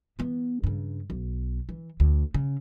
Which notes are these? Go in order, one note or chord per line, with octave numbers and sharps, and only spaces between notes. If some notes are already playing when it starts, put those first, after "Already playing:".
E3 B3
G2 C#3
B1
E3
D2
C#3